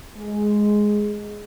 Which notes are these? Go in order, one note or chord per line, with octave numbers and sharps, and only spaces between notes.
G#3